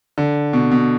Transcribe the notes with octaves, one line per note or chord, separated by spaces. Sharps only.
D3
B2
B2